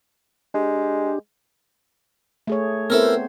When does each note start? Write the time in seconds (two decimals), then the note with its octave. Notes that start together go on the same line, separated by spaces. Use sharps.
0.54 G#3 D4 G4
2.47 A3 G#4 C#5
2.90 B3 C4 E4 A4 A#4 C5